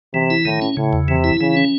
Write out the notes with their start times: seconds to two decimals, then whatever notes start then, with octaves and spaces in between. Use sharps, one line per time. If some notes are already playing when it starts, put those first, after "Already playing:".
0.14 C3 E3
0.30 E4
0.45 A2 D#3
0.62 C#4
0.77 A2 C#3
0.93 E2
1.08 C3 E3
1.24 E4
1.41 C#3 E3
1.57 C#4